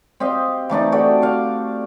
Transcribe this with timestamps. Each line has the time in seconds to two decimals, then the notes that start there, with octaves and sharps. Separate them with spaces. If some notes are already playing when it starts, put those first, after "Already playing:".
0.20 C4 G4 D#5 F5
0.70 E3 A3 D4 D#4
0.92 F#4 A4 D5 G5
1.22 F5 D6